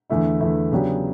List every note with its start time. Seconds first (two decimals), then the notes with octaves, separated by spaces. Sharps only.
0.10 E2 D3 A3 E4
0.40 E2 D3 A3 E4
0.72 C#3 F#3 B3 D4 G4